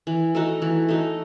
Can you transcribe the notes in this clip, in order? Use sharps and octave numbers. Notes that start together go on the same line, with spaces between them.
E3
A3 D#4 F#4
E3
A3 D#4 F#4